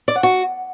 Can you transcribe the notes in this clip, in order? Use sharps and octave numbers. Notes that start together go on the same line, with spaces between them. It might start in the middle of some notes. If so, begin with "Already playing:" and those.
D5
F#5
F#4